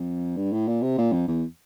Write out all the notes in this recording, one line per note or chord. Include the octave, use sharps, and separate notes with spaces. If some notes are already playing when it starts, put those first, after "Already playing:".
Already playing: F2
G2
A2
A#2
C3
A#2
F2
E2